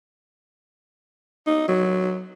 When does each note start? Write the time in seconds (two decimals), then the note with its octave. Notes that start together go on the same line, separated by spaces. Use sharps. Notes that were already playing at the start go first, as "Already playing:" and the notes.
1.47 D#4
1.68 F#3